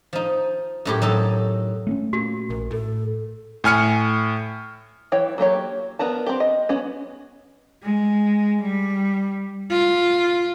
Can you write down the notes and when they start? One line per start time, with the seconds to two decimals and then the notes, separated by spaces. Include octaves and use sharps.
0.13 F3 D#4
0.85 F#2 A2 G4
1.02 F#3 D#4 A4
1.87 A3 C4 C#4
2.13 A#2 F#4
2.50 A#1 A#4
2.71 A2 A4
3.64 A2 G#5 F6 C#7
5.12 E3 C#5 G5
5.38 F#3 A#3 G4 C#5
5.99 B3 D4 A#4 A5
6.27 C4 G4
6.40 D#5
6.69 B3 C#4 F#4
7.83 G#3
8.61 G3
9.70 F4